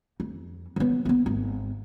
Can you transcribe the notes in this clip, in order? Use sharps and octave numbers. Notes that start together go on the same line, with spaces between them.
F2
F#3 B3
A3 B3
G#1